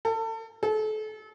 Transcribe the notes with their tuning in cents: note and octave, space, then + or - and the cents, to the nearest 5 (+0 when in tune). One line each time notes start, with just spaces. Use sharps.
A4 +30
A4 -35